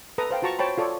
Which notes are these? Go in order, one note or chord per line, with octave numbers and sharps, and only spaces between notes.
A4 B4 A#5 D#6
C5 F5 G5
F4 F#4 A5 A#5 C#6
C5 C#5 G5 A5 B5
F4 A4 C#5 D5